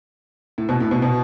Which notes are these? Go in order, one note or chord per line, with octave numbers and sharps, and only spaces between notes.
A2
B2
A2
B2
B2